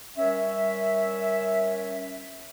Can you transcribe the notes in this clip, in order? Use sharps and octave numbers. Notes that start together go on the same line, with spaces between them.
G3 C#4 A#4 C#5 E5